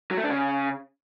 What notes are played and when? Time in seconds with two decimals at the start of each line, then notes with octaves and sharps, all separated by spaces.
0.11 F#3
0.17 A3
0.24 D4
0.30 C#3